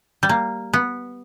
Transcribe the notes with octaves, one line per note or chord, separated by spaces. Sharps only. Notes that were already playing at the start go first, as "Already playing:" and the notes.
G3
A#3
B3